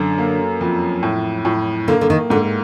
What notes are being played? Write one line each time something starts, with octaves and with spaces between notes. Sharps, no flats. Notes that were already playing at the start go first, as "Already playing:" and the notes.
Already playing: F#2 D3
A#3
F2
A2
A2
D3 A#3
D3
D#3
G#2 D3